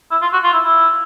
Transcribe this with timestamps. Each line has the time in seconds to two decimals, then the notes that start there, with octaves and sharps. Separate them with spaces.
0.11 E4
0.22 F4
0.33 F#4
0.44 F4
0.53 E4
0.64 E4